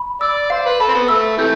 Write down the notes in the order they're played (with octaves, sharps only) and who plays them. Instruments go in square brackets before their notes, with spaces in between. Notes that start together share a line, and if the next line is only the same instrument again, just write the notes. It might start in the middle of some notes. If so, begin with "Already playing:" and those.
Already playing: [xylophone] B5
[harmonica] D5 [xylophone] E6
[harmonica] C5 [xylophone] F5
[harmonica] B4
[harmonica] A4 [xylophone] B5
[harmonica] C4
B3
[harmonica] A3 [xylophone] E6
[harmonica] C3 E3 A3 [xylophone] G6